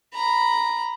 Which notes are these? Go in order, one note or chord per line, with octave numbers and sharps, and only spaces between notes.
A#5 B5